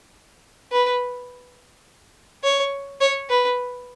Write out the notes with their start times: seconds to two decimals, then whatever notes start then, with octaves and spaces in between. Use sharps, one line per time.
0.72 B4
2.44 C#5
3.01 C#5
3.29 B4